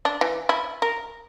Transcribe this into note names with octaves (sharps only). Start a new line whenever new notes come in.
D4
E3
E4
A#4